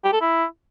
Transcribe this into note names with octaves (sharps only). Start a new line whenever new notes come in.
G4
A4
E4